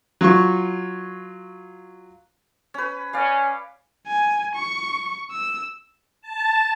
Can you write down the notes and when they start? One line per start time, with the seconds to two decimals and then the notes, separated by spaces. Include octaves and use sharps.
0.21 F#3 F4 C#6
2.74 C#4 B4
3.13 C#4 D5 F5
4.07 G#5
4.55 C#6
5.31 E6
6.22 A5